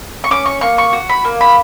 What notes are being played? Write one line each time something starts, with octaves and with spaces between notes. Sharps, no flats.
C#6
C#4 D6
C#6
A#3 C#6
C#6
F#4
B5
A#3
B5